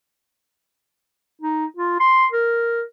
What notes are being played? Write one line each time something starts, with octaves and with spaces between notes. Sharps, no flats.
D#4
F4
C6
A#4